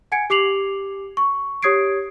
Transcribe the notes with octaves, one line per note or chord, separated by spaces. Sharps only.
F#5 G#5 G#6 C#7 D7
G4 D6 C7 F7 F#7
C#6
G4 C#5 D#6 G#6 C7 D7